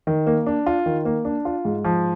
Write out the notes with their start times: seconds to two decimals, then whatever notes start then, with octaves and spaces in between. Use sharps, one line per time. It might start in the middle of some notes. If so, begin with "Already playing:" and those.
0.07 D#3
0.27 A#3
0.47 D4
0.66 F4
0.86 D#3
1.05 A#3
1.25 D4
1.45 F4
1.65 G#2
1.85 F3